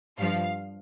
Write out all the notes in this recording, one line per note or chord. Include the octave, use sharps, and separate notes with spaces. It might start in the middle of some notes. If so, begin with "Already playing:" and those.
G2 F3 F5